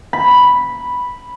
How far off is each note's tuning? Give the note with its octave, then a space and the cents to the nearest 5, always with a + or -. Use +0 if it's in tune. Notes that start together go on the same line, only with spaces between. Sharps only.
B5 -5